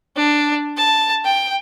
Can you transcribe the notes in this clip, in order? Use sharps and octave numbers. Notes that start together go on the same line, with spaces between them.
D4
A5
G5